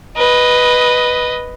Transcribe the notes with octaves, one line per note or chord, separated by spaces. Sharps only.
B4 D#5